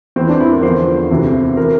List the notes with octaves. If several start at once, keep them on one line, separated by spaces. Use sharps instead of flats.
E2 E3 C4
D4
E4
A#4
E2 D3 F3 C5
D2 C3 E3
E3 A#4